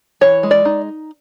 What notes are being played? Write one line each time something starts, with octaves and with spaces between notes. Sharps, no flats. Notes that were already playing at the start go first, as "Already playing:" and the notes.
E3 C#5
G#3
D5
D#4